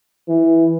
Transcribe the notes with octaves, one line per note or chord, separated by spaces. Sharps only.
E3